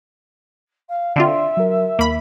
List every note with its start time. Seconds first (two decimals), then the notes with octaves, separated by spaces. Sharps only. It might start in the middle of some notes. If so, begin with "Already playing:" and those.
0.89 F5
1.16 D3 C4 F4 D5 E5 C6
1.57 F#3 A#4
1.99 D#2 A#3 B5